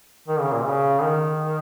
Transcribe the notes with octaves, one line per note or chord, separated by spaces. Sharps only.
D#3
C#3
A#2
C#3
D#3